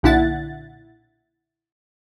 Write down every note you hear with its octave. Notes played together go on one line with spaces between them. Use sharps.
B1 A#2 D3 E4 F#5 A6